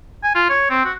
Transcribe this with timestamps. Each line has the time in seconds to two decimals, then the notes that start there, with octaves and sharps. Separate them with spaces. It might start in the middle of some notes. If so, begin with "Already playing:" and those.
0.24 G#5
0.35 F4
0.50 C#5
0.70 C4
0.85 F#4